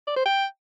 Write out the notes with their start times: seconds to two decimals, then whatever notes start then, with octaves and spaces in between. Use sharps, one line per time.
0.07 D5
0.16 C5
0.26 G5